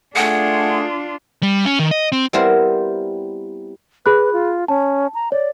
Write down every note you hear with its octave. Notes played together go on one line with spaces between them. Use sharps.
A3 D4 F4 G#4 F#5
G3
C#4
D#3
D#5
C4
G3 B3 C4 E4 A#4 C5
G#4 B4 B5 F#6
F4
C#4 A5
A#5
C#5 D5